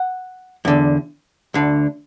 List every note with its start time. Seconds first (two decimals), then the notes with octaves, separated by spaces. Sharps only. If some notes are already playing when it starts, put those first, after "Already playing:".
Already playing: F#5
0.65 E2 D3
1.54 D2 D3